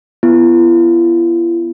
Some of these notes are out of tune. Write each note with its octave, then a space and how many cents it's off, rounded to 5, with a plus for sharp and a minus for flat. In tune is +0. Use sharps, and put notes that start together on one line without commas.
B3 +0 E4 +45